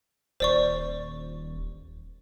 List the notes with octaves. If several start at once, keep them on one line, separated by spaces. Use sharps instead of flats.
D#1 C5 D5 C#6